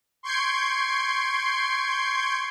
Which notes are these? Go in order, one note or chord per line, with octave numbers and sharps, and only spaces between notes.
C6 C#6 G6 G#6 C7 D7